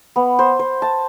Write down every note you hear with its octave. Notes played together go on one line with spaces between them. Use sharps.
B3
C5
C5
A5